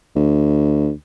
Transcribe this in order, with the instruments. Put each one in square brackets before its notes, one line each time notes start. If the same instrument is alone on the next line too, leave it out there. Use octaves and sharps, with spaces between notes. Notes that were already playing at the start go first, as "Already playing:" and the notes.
[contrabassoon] D2